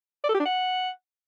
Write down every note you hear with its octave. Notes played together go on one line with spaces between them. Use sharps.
D5
A4
G4
D4
F#5